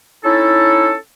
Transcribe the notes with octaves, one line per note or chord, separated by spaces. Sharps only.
C#4 D#4 E4 A4